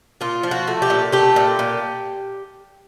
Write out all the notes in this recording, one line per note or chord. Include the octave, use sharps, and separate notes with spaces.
A#2 F4
F3
F#4
A3
G4
A#2
A3 G4
A#2
A#2